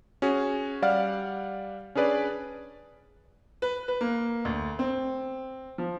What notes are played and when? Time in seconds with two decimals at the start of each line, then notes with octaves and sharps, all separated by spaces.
0.22 C#4 F#4 G#4
0.82 G3 D5 F5 F#5 F6
1.95 C#4 D4 G#4 B4 D5
3.62 B4
3.88 B4
4.01 A#3
4.45 D2
4.79 C4
5.78 F3